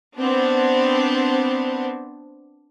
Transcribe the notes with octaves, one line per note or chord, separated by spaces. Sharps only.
B3 C4 D4